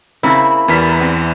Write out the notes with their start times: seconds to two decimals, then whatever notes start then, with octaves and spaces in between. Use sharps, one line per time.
0.23 C#3 A#3 C4 E4
0.68 E2 E3 G3 A#4 B6
0.99 B3 C4